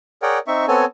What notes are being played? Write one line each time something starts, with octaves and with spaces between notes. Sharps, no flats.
G#4 A#4 C#5 D5 F#5 G5
C4 D#4 E5 C#6
B3 C4 A4 C#5 G#5